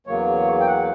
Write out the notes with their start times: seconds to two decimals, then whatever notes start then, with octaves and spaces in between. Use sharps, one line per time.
0.07 E2 C#3 F#3 A#3 C#5
0.61 G5
0.67 F#5